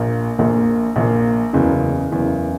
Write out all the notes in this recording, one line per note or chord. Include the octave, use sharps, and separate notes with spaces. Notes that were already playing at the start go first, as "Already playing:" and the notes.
Already playing: A#1 A#2 A#3
A#1 A#2 A#3
A#1 A#2 A#3
F#1 E2 C#3
F#1 E2 C#3